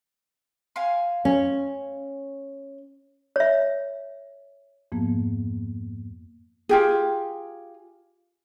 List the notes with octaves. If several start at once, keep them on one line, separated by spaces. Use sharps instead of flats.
F5 G#5 C6
C#4
C#5 E5
F2 G#2 F3 A#3 B3
F4 G4 G#4